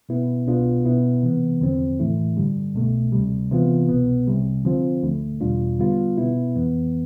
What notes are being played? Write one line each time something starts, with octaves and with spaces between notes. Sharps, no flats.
B2 B3 E4
C2 B2 B3 D4 F4
B2 B3 E4
C3 E3 B3
E2 D3 F3 C4
A2 E3 A3 E4
G2 D3 G3
C2 B2 A3
D2 C3 G3
C3 E3 B3 F4
C2 B2 B3
C2 C3 G3
D3 F3 C4 F4
D2 D3 A3
E2 B2 G3 D4 F4
D3 G3 B3 F4
B2 B3 E4
F2 E3 B3